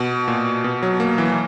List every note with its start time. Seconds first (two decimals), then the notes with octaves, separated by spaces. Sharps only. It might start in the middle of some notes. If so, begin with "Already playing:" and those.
Already playing: B2
0.28 A#2
0.64 B2
0.83 F#3
1.00 A#3
1.18 E3
1.30 E3